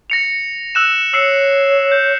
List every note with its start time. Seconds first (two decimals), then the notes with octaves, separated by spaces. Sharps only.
0.10 A#6 C#7 F7
0.75 E6 F#6 E7
1.13 C#5 E6 C7 C#7
1.92 G6